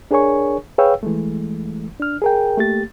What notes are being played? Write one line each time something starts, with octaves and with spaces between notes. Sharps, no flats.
D4 G#4 A#4 C#5 G#5 C#6
G#4 B4 C#5 F5 G5 E6
E3 G#3 A3
D4 F6
G#4 A#4 G5
A3 A#3 G4 A6